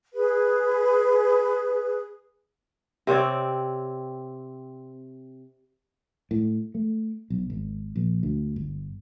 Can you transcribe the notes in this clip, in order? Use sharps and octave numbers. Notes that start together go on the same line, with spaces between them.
G#4 B4
C3 C4 C#5 D5
A2
A3
B1
G#1
A#1
D2
G1